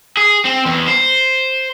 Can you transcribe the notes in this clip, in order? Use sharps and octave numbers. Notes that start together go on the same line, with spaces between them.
G#4
C4
E2
C5